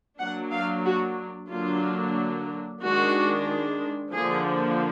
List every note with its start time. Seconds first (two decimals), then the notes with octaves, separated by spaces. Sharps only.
0.18 F#3 A#3 D4 F#5
0.51 F5
0.84 F#4
1.49 D3 F#3 A#3 D4 F4
2.82 D#3 G#3 D4 F#4
4.13 D3 F3 A#3 G#4